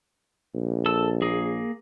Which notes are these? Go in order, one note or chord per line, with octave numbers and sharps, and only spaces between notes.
A#1
A4 E6
A#3 G#4